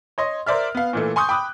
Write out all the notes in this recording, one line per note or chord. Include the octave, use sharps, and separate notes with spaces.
C#5 D#5 C6
A#4 C5 D5 E5 F6
B3 F5
A#2 E3 A3
G#5 C6 C#6 D#6 G6
G5 B5 D6 D#6 F#6